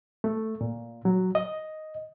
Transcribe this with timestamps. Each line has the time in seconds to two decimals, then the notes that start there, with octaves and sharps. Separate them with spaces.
0.24 A3
0.61 A#2
1.05 F#3
1.35 D#5